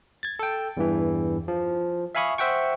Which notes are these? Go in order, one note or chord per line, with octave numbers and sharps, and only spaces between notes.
G#6 A6
A4 G5
E2 G2 E3
F3
E5 F5 G#5 B5 C#6 D#6
C5 E5 F#5 G5 C#6